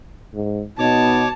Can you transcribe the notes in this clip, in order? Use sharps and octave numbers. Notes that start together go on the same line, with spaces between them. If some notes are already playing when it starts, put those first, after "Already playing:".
G#2
B2 B3 D#4 C#5 A5 D6